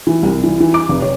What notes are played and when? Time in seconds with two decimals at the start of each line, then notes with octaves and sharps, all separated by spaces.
0.07 E3
0.23 C2
0.44 E3
0.60 E3
0.74 D6
0.89 F1
1.02 C#5